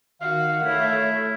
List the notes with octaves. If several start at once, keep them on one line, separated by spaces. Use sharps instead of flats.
D#3 F#4 F5
A3 E4 C#5